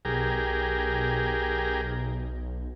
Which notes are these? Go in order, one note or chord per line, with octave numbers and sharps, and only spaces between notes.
B1 G4 G#4 A#4